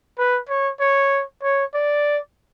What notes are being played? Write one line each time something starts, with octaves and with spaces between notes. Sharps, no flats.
B4
C#5
C#5
C#5
D5